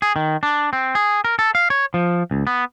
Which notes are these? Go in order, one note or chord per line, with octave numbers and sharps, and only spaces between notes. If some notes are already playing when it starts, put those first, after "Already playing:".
G#4
D#3
D4
C4
G#4
A#4
A4
F5
C#5
F3
C#2
B3